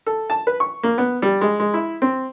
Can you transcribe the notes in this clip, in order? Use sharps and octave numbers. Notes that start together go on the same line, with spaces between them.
A4
A5
B4
C#6
A#3
B3
G3
G#3
G#3
E4
C4